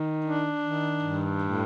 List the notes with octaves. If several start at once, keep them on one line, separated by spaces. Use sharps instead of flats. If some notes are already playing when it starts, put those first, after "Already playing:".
Already playing: D#3
D4
D#3
G2
A2